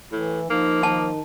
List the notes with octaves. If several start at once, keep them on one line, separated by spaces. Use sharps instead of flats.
A2 E3
F3 A#3 D#4
D#3 A5